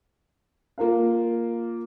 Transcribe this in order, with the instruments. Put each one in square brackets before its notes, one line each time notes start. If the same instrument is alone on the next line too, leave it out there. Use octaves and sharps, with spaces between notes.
[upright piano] A#3 F4 A#4 F5